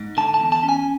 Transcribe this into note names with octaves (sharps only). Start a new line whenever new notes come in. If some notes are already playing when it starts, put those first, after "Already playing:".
Already playing: G#2
D3 A5
A5
E2
A5
C#4
G#5